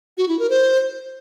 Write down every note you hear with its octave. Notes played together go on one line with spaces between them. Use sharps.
F#4
E4
A#4
C5